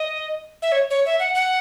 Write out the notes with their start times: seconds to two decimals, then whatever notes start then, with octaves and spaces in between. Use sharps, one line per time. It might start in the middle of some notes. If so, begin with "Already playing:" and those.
Already playing: D#5
0.62 E5
0.72 C#5
0.90 C#5
1.06 E5
1.20 F#5
1.35 F#5